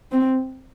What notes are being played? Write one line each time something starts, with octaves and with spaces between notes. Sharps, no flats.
C4